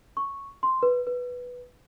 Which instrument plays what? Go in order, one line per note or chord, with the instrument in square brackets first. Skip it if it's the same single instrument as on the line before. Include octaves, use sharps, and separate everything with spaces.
[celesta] C#6
C6
B4
B4